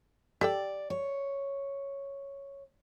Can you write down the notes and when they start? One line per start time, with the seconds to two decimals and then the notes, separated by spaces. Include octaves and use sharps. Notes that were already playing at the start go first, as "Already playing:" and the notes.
0.41 G4 A4 D5 G5
0.90 C#5